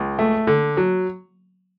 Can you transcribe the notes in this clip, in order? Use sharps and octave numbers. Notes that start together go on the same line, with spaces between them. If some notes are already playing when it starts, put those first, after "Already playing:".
Already playing: C#2
A3
D3
F#3